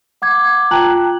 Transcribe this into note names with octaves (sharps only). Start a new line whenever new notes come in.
F#5 D6 G#6
F4 G5 A5 A#5 F#6 F#7